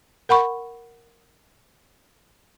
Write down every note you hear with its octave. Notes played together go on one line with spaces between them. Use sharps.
A#4 F#5 B5 C#6